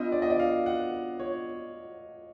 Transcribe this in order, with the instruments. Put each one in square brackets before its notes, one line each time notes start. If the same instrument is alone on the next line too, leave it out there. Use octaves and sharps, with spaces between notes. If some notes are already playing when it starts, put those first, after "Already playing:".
Already playing: [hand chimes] B3 D4 F4 [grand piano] D#5
[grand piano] D5
D#5
D5
F5
F#5
C#5